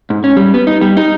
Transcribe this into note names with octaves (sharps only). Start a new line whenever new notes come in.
G#2
C#4
G3
B3
D#4
G3
D#4